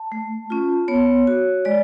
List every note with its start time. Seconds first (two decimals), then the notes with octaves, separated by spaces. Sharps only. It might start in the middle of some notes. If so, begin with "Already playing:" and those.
Already playing: A5
0.12 A3
0.50 C#4 F4
0.88 B3 C#5
1.27 F#4
1.65 G#3 D5